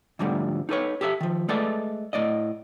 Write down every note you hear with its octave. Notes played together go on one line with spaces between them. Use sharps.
D2 G#2 D3 F3 G3 A3
D#4 A4 B4 C#5
G4 A4 B4 E5
D#3 F3
G#3 A3 A4 B4 D5
A2 D5 D#5